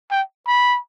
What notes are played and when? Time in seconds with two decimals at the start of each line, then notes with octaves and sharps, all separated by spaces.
0.11 G5
0.47 B5